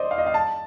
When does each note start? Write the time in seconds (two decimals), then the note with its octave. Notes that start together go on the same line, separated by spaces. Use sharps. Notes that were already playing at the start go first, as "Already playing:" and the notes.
Already playing: C5 D5 D#5
0.11 F5
0.18 D#5
0.27 F5
0.34 A5